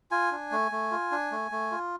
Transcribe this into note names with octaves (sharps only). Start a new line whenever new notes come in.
F4 G#5
D4
A3
A3
F4
D4
A3
A3
F4